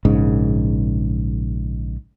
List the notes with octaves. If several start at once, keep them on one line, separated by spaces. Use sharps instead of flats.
A#1 G#2 C#3